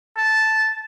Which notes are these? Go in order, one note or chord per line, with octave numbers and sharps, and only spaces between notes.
A5